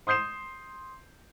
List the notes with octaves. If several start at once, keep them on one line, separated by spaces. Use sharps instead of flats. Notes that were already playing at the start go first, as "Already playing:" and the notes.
C6 D#6 G6 C7 E7